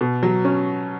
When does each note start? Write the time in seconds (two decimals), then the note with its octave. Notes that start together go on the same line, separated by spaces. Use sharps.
0.01 B2
0.23 F#3
0.45 C#4